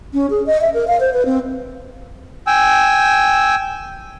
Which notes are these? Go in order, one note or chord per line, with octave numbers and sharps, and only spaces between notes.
C#4
G#4
D#5
E5
A#4
F5
C5
B4
C4
G5 G#5 E6